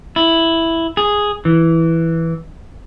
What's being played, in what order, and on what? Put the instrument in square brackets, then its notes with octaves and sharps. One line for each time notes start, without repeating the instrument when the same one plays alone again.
[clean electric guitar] E4
G#4
E3